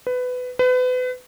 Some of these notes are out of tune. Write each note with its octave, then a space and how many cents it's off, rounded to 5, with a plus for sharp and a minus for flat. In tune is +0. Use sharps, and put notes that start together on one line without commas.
B4 +20
B4 +35